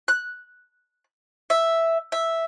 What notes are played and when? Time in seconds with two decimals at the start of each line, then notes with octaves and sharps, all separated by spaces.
0.08 F#6
1.50 E5
2.12 E5